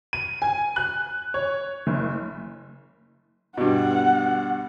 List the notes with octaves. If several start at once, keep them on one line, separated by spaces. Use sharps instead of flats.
D#7
G#5
F#6
C#5
F#1
G2 B2 F#5